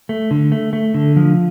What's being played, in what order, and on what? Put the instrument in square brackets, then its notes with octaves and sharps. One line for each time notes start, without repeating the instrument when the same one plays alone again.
[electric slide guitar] A3
D3
A3
A3
D3
F3